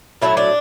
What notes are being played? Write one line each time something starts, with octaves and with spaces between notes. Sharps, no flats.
A2 F#3 A3 E4
D4